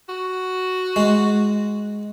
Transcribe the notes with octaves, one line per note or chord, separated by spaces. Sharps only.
F#4
G#3